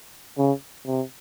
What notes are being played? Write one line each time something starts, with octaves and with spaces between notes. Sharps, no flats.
C#3
C3